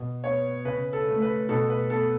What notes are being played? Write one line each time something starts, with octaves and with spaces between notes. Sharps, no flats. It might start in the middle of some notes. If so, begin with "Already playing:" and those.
Already playing: B2
B3 C#5
C#3 B4
A4
A3
B4
B2 A4
B4
B3 A4